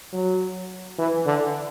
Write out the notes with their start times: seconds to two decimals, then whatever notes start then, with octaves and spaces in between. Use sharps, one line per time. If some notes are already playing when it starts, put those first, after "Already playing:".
0.13 F#3
0.99 E3
1.26 D3